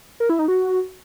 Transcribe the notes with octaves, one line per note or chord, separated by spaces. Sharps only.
A#4
E4
D#4
F#4